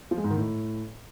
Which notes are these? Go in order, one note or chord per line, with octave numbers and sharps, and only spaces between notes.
F3
G#3
G#2
D#3
A2